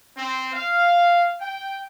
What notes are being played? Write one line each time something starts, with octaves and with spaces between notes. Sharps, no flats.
C4
F5
G5